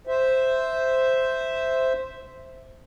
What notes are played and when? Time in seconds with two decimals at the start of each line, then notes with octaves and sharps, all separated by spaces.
0.07 C5 E5